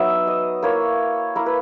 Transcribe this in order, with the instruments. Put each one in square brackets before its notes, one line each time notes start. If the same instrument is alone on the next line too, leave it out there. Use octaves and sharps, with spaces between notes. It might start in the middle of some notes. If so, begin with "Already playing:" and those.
Already playing: [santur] F#3 B3 D#4 E5
D#5
A#3 E4 C#5
A#3 E4 A#4
B4